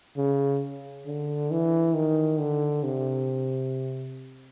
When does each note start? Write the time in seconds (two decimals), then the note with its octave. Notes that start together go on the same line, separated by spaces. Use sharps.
0.17 C#3
1.06 D3
1.51 E3
1.94 D#3
2.39 D3
2.83 C3